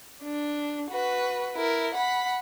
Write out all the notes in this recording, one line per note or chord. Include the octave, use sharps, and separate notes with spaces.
D4
F#4 B4
E4 A#4
F#5 B5